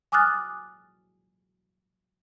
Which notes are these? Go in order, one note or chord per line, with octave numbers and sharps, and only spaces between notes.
G#5 D6 D#6 F6 F#6 A6